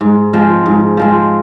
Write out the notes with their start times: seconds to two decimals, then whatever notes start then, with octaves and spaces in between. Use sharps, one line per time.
0.01 G#2
0.33 F3 G#3 C4
0.66 G#2
0.97 F3 G#3 C4